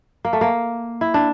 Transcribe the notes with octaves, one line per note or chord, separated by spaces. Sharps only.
A#3
A3
A#3
E4
D4